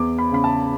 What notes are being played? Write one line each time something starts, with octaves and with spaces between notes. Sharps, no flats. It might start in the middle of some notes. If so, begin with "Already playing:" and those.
Already playing: E2 D6
B5
C#3 B5
A5